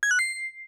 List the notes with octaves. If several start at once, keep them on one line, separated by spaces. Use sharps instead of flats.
G#6
F#6
C7